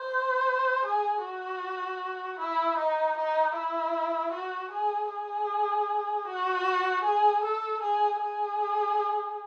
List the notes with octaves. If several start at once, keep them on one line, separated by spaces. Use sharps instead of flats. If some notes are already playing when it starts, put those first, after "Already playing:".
Already playing: C5
G#4
F#4
E4
D#4
D#4
E4
F#4
G#4
G#4
F#4
G#4
A4
G#4
G#4